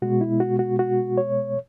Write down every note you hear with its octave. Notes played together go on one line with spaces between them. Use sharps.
B2 G#3 B3 F#4
E4
F#4
F#4
F#4
C#5